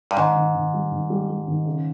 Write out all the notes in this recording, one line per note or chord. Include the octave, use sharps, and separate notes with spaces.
G2
G#2 D#3
D#3
D#3
G3
D#3
G3
G3
D#3
C#3